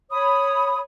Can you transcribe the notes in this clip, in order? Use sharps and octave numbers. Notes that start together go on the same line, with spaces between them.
C#5 B5 D#6